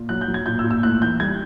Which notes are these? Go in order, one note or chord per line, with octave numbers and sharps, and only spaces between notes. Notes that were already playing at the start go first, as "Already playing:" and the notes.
Already playing: A#2
F#3 F#6
G6
F#3
G#6
A#2 G6
E6
A#2
E6
A2 F#6
E3 G6
G3 G#6